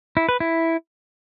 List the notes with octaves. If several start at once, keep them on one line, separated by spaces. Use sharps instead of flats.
E4
B4
E4